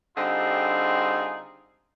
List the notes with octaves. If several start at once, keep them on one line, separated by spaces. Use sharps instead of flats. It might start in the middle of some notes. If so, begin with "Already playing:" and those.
D3 G3 C4 D#4 F4 G#4